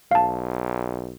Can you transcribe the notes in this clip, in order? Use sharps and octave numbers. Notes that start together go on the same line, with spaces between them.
B1 F5 A5